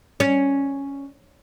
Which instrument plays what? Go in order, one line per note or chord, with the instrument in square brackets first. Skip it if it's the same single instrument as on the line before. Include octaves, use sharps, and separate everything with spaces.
[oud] C#4